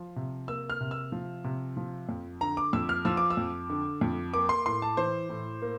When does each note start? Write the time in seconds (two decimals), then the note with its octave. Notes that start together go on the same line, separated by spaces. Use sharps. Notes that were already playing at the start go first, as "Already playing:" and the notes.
Already playing: F3
0.16 C3
0.48 A#3 E6
0.70 F6
0.80 C3
0.91 E6
1.12 F3
1.44 C3
1.77 F3
2.09 F2
2.41 D3 A#5
2.57 D6
2.73 F2 E6
2.89 F6
3.05 F3 E6
3.17 D6
3.30 E6
3.37 F2
3.70 D3
4.01 F2
4.34 A#3 D6
4.49 C6
4.66 A2 C6
4.82 A5
4.97 E3 C5
5.29 A2
5.62 A#3